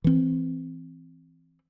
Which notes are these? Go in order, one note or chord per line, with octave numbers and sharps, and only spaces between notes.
E3 C4